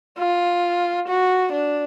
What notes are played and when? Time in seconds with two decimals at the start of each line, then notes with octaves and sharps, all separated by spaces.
0.19 F4
1.08 F#4
1.52 D4